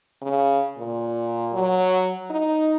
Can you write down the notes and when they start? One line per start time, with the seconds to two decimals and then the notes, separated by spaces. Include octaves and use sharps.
0.22 C#3
0.77 A#2
1.52 F#3
2.30 D#4